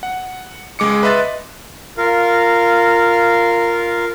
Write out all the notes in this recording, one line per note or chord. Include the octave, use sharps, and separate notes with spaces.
F#5
C#2 G#3 D6 C#7
B4 D#5 E5 C6 F#6 A6
F4 A#4 F5